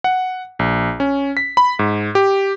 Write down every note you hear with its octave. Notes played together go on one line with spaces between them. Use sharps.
F#5
A#1
C#4
B6
B5
G#2
G4